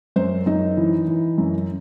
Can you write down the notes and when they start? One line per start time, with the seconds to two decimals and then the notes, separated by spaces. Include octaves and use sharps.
0.16 F#2 C5
0.46 F#2 D#4
0.77 E3
1.08 E3
1.38 F#2